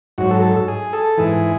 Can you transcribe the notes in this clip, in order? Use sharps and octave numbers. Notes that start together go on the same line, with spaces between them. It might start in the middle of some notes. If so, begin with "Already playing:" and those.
G#2 F#3 F#4
A4
A4
G#4
A4
G#2 E3 G#4